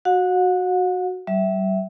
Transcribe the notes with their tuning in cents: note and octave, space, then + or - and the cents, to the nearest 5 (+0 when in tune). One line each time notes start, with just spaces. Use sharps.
F#4 -5 F#5 -45
G3 -40 E5 +0